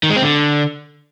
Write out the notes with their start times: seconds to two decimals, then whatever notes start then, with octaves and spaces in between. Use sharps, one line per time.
0.03 D#3
0.10 G#3
0.16 C4
0.23 D3